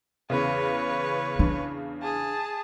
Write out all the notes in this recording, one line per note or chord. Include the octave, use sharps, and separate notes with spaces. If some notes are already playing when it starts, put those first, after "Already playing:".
E2 C#3 B4 C#5
D4
G#4 A5